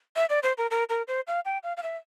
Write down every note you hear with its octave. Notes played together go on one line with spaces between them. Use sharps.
E5
D5
C5
A#4
A#4
A#4
C5
F5
G5
F5
F5
E5